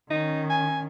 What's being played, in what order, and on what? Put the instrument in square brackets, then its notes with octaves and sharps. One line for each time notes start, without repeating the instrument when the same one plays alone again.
[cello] D#3 C#4 [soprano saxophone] D#4
[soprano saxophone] G#5